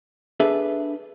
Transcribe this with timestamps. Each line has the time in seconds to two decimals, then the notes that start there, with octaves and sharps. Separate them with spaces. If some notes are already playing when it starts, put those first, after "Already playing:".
0.40 D4 G#4 A4 B4 E5